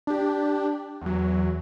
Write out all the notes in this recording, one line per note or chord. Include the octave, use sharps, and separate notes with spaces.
D4 G4
E2 F#3